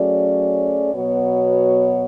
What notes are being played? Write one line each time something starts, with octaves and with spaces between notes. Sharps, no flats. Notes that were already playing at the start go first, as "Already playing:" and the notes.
Already playing: F#3 A3 C#4 G#4 D5
B2 F#3 B3 F#4 C#5